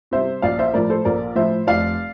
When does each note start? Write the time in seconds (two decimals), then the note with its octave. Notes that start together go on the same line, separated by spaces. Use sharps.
0.11 C3 G3 C5 E5
0.42 A#1 D5 F5
0.59 C5 E5
0.74 A2 F3 A#4 D5
0.90 A4 C5
1.05 A#1 A#4 D5
1.36 A2 F3 C5 E5
1.67 F1 D5 F5